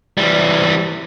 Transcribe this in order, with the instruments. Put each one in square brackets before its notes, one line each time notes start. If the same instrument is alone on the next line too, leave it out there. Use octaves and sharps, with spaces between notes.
[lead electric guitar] E3 G3